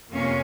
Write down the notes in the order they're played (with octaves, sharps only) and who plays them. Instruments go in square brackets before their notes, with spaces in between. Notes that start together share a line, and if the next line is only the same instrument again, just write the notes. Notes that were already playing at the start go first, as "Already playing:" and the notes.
[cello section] F2 C3 A#3 C#4